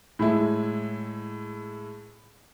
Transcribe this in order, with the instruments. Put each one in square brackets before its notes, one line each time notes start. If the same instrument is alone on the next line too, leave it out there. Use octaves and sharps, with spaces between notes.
[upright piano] A2 G#3 E4